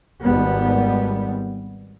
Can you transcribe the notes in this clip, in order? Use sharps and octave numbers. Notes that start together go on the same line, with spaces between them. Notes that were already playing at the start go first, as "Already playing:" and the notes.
G#1 G3 B3